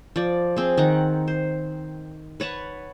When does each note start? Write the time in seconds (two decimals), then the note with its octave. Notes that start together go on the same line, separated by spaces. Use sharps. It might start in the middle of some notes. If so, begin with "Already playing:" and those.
0.16 F3 D5
0.57 C4 G#4
0.77 D#3 F#5 A#5
1.28 C5
2.40 B4 C#5 F#5 A5